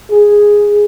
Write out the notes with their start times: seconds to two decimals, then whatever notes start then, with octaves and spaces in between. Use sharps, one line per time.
0.11 G#4